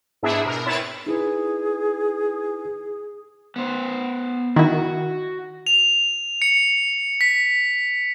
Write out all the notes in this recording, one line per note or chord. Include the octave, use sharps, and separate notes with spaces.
G#2 B3 D4 E4 G#4 E5
B2 A#4
C4 E4 B4 C#5 A6 E7
D#4 E4 G#4 B4
B3 C5
D#3 E4 F#4
F7
C#7
B6